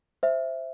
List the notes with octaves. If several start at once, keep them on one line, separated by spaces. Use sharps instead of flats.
C5 E5